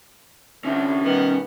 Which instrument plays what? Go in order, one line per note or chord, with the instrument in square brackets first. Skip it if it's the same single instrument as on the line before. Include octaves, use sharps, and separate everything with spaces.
[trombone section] C2 D3 [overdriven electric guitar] C#4 E5
[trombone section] B1 D#3 G3 [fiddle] B3